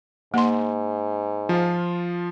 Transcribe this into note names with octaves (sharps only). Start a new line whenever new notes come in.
G#2 A#3 C6
F3 F4